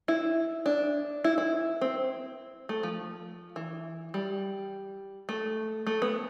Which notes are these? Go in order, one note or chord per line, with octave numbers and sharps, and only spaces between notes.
E4
D4
E4
E4
C4
A3
F3
E3
G3
A3
A3
B3